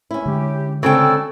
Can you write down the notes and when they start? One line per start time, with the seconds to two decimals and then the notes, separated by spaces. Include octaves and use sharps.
0.11 C#4 E4
0.26 D3 G#3 G4
0.83 C#3 C4 F#4 G#4 A4 D5 G5 E6